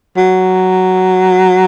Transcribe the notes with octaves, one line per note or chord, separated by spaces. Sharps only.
F#3